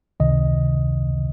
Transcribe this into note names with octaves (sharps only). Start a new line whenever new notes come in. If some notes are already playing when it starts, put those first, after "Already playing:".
C#2 C3 D#3 D#5